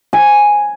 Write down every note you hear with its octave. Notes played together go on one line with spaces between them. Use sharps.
G#5